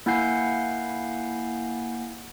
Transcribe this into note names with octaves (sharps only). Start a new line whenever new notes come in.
A#3 E4 F#5 G#5 G6 C7